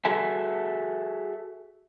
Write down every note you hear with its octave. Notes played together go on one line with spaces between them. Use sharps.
F#4 G#4 A4 E5 F#5 G#5